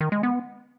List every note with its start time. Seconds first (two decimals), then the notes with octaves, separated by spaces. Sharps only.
0.01 D#3
0.12 G#3
0.23 B3